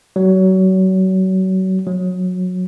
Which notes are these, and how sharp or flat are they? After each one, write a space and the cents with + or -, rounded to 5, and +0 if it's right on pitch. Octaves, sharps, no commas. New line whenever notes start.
F#3 +30
F#3 -20